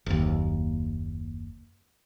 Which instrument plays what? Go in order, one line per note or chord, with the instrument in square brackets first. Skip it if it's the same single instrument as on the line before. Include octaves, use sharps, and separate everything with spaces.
[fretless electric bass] F#1 D#2